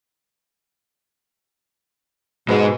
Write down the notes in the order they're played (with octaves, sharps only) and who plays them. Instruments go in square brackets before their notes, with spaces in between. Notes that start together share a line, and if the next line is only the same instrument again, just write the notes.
[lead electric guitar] G#2 G#3 [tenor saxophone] B2